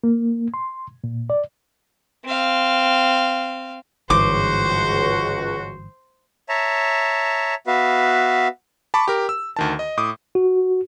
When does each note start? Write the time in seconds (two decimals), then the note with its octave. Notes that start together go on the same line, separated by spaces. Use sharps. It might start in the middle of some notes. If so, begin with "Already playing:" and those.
0.04 A#3
0.54 C6
1.04 A#2
1.30 D5
2.25 C4 F5
4.10 G1 C#2 G#2 E3 F#4 C5 D6
6.49 C#5 E5 A5 A#5
7.67 B3 F#4 B4 E5 F5
8.94 A5 B5 C#6 D6
9.08 G4 A#4
9.29 E6
9.56 D2 D#3 A5
9.79 D#5
9.97 A2 D6 D#6
10.35 F#4